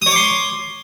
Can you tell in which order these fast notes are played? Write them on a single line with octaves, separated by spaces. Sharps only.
D#6 C#5 D6 C6